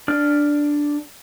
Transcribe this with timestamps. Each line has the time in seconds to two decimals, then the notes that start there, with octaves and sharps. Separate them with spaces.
0.08 D4 D5 F6